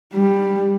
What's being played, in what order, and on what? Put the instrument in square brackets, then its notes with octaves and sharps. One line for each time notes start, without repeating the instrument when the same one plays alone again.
[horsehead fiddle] G3